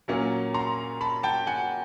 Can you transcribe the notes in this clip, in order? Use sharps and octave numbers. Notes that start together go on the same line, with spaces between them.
A#2 F#3 A#3 C#4
A#5 C6
A5 B5
G5 A5
F#5 G#5